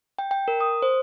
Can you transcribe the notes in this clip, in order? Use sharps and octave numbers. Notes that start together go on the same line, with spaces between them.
G5
G5
A#4
D#6
C5